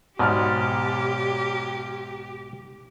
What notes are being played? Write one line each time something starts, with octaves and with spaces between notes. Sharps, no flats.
B1 G#2 B2 G4 D5 F6